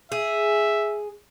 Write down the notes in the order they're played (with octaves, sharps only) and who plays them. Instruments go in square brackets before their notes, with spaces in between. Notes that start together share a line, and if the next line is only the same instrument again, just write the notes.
[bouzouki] G#4 [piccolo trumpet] E5